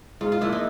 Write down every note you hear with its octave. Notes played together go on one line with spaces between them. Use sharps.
G#2 F4
F4
F3 A#3 D4 E4
D#4